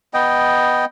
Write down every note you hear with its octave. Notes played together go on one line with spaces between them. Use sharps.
B3 D#5 G5